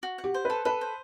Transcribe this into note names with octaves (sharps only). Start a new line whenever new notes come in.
F#4
F#5
G4
C5
A4 B4
A4 B4
C5